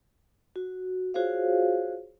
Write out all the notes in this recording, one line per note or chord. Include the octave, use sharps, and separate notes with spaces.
F#4
F4 F#4 G#4 C5 C#5 F5